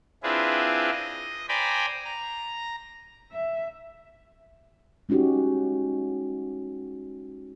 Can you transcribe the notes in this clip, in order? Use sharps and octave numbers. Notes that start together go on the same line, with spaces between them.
C4 D4 E4 F4 G#4 B4
D#5
C5 D5 G5 G#5 A#5 B5
A#5
E5
G#3 C#4 D#4 F#4 G4